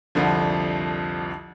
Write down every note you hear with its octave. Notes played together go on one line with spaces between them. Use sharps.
C2 F2 D3 F3